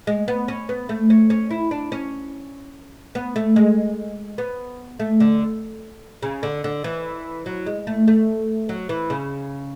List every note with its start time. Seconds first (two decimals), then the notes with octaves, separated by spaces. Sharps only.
0.07 G#3
0.28 B3
0.48 C#4
0.69 B3
0.89 A3
1.10 C#4
1.30 C#4
1.51 E4
1.71 D4
1.92 C#4
3.15 B3
3.36 A3
3.56 G#3
4.38 B3
5.00 A3
5.20 D3
6.22 C#3
6.43 D3
6.64 D3
6.84 E3
7.46 F#3
7.66 G#3
7.87 A3
8.08 A3
8.69 F#3
8.89 E3
9.10 C#3